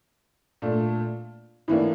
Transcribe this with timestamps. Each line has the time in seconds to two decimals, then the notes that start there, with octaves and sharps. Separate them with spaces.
0.62 A#2 A3 D4
1.68 A2 E3 A#3 D4